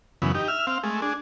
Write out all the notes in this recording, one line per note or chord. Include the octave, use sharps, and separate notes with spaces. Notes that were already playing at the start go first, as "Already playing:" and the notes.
F#2 C#3 E3 B3
D#4 G4
E5 F6
C4 F5
G#3 A3
D4 G#4